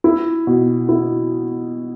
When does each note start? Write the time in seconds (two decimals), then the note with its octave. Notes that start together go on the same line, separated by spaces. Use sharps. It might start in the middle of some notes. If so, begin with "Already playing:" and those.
0.04 E4
0.47 B2
0.89 E4